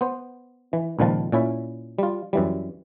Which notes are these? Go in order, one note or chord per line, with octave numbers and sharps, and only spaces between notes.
B3 C5
E3
C#2 A#2 D#3 F3 A5
A#2 C#4 E4 E5
G3 F4
F#2 E3 G3